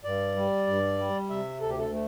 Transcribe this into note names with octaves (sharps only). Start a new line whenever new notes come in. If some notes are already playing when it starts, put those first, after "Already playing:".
G2 D5
G3
G2
G3
C3 E5
D2 A4
G4
A4
A3